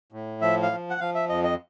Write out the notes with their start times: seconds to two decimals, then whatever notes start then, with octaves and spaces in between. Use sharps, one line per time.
0.12 A2
0.42 F3 E5
0.62 F5
0.72 F3
0.90 F#5
1.00 F3 F5
1.15 E5
1.29 F2 D#5
1.44 D#5